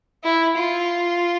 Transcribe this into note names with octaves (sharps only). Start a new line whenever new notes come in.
E4
F4